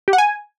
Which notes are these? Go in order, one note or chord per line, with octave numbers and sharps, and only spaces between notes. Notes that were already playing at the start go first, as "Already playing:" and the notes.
G4
F#5
G#5